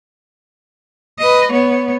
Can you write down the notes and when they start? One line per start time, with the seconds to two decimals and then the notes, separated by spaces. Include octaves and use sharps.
1.19 B4 D#5
1.52 B3 C#5